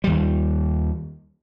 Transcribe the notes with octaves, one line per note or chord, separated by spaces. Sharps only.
D#2 G3